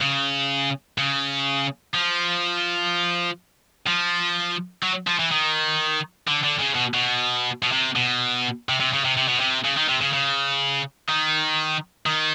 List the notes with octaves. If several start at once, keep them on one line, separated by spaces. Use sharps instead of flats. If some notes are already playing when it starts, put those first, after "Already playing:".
C#3
C#3
F3
F3
F#3
F3
E3
D#3
D3
D3
C#3
B2
B2
B2
C3
B2
C3
C3
C#3
C3
C3
B2
C3
C#3
D#3
C3
C#3
C#3
D#3
D#3